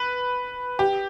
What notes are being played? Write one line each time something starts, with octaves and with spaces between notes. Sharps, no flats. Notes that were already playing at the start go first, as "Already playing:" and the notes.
Already playing: B4
G4